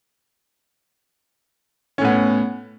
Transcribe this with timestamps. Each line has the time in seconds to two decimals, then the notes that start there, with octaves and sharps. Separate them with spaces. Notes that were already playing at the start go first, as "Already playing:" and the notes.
1.98 C#4
2.01 A2
2.05 B3